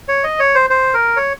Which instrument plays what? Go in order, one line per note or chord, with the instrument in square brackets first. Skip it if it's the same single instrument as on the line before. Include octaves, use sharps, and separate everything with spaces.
[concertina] C#5
D#5
C#5
C5
C5
A#4
C#5